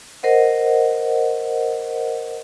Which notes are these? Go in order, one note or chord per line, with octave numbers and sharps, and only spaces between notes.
A#4 C5 D#5 F#5